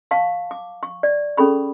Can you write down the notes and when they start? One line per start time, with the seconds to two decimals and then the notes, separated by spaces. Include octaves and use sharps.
0.11 F5 A5 C#6
0.51 D6
0.83 C#6
1.03 D5
1.37 C#4 G#4 A4 B5 C#6